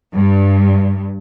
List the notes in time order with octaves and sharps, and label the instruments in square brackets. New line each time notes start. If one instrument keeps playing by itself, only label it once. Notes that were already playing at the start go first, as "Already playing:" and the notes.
[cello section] G2